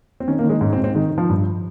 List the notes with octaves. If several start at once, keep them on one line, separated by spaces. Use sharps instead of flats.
C4
D#3 C#4
A#3
D#3
G#3
G#2 C#4
C4
G#2
C4
D#3 G#3
D#3
F3
G2